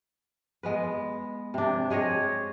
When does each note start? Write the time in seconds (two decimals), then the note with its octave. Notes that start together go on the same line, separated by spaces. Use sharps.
0.63 G#3 B3 B4
1.54 C3 D4
1.90 G#3 G#4 C#5 D#5